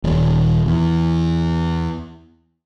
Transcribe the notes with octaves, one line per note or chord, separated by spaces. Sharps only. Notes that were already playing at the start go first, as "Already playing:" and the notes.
D#1
E2